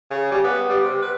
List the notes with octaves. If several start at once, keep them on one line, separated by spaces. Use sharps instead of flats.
C#3
G3
B3
G3
C3
B4